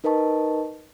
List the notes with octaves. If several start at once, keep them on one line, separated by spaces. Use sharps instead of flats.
D#4 A#4 B4 D#5 A5 C#6